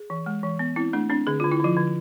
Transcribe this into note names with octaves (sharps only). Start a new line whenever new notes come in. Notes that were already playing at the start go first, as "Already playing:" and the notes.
Already playing: G#4
E3
G#3
E3
B3
C4 E4
A3 D4
C4 D4
D3 G#4
D3 F4
E4
D3 F3 F4
D3